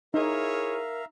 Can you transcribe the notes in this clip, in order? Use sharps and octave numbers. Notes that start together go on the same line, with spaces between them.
D#4 E4 G#4 A#4 C#5 E5 F5 A#5